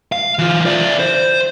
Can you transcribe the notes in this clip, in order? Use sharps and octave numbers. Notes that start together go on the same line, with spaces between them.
F5
E3 F4
E4 D5
C5